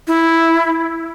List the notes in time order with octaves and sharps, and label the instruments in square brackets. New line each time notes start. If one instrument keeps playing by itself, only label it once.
[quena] E4